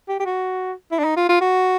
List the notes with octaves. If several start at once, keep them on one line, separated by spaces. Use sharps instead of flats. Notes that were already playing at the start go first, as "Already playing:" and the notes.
G4
G4
F#4
E4
D4
D#4
F4
F4
F#4